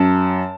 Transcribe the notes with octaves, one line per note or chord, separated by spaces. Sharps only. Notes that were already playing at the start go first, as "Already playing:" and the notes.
Already playing: F#2 A5